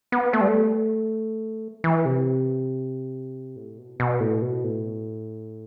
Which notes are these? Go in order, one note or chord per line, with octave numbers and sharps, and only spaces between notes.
B3
A3
G3
A3
E3
C3
A2
B2
B2
A2
B2
A2